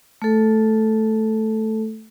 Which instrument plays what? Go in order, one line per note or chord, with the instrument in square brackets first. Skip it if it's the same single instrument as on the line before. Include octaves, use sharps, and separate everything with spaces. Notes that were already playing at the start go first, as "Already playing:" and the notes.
[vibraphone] A3 A4